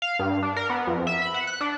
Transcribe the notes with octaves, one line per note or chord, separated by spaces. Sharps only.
F5
G2
D4
A#4
B3
F2
E5
B5
F#5
F#6
D4